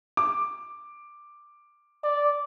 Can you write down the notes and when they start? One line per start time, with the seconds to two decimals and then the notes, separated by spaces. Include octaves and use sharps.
0.17 D6
2.04 D5